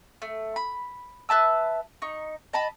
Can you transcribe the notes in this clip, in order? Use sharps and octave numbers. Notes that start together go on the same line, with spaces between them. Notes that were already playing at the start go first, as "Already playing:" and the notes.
A3
B5
B4 E5 A5 E6
D#4 C#6
D#5 A5 B5